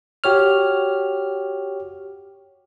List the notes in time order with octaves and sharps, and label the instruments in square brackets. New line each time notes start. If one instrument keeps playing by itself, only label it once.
[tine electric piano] F#4 G4 C#5 F6